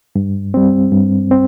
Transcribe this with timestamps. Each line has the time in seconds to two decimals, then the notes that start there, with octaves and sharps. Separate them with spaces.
0.15 G2
0.54 G3 C4
0.92 G2
1.31 C4